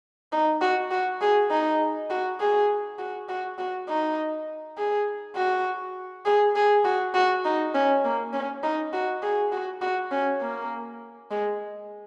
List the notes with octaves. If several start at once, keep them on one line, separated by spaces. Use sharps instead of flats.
D#4
F#4
F#4
G#4
D#4
F#4
G#4
F#4
F#4
F#4
D#4
G#4
F#4
G#4
G#4
F#4
F#4
D#4
C#4
A#3
C#4
D#4
F#4
G#4
F#4
F#4
C#4
A#3
G#3